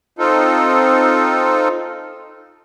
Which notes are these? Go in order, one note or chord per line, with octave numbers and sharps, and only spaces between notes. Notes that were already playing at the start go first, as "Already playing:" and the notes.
C4 D#4 F4 A4